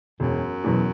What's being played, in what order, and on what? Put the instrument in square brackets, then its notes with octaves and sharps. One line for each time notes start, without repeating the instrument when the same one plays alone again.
[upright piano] E1 [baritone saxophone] F#2
[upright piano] E2 B2 F#3